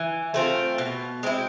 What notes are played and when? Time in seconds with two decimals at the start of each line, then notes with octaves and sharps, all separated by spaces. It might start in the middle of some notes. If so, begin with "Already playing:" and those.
Already playing: E3
0.34 A3 C4 F4
0.78 B2
1.23 G#3 C4 E4